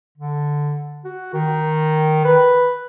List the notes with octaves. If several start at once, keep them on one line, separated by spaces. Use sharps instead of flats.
D3
F#4
D#3
B4